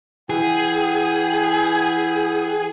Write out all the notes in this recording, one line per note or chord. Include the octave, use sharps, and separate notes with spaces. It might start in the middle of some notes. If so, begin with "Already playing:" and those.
E3 G#4 F#5 G5